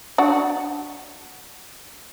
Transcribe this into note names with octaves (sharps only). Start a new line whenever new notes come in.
D4 F#4